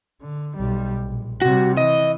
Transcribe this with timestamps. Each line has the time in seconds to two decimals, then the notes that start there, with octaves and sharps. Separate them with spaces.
0.21 D3
0.57 B1 G3
1.03 A#1
1.42 C3 G3 F#4
1.77 E3 D#5